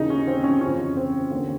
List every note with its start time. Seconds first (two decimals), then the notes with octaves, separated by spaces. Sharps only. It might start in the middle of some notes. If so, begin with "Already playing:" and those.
Already playing: D#2 C#3 E3 D#4
0.10 C#4
0.27 C4
0.44 C#4
0.61 F2 C#3 E3 C#4
0.97 C4
1.31 D#2 D3